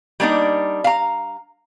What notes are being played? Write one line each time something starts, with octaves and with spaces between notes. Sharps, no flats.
G3 A#3 D4 D#4
F5 A#5